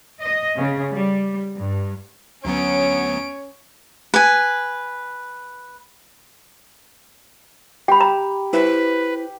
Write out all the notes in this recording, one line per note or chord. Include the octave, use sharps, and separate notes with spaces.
D#5
C#3
G3
G2
D2 F#3 B3 C#4 C#5 D7
B4 G#5
G4 G5 B5
A#5
E4 B4 C5 E5